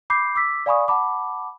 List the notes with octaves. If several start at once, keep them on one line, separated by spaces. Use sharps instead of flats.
B5 D6 G6 C7
D6 E6 B6
D5 F5 G#5 B5 C#6 D#6
F#5 A5 B5 D6